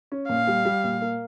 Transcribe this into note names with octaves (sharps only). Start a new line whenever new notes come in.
C#4
A#2 F5
G3
G3
A#2
A#3